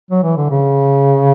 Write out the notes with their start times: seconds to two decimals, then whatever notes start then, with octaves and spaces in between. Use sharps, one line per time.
0.11 F#3
0.23 E3
0.37 D3
0.50 C#3